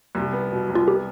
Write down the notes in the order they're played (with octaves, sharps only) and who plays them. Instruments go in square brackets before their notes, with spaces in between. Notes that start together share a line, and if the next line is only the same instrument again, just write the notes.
[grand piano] C2
B3
B2
C2
[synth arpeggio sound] F4
[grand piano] B3 [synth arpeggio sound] G4